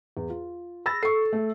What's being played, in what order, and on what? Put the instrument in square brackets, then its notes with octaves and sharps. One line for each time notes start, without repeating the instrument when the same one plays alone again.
[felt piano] E2
F4
[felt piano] B5 E6 A6 [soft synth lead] A#6
[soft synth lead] A4 [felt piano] C#6 C7
[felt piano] A3